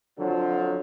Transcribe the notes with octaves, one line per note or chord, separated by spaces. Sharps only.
F2 D3 F3 F#3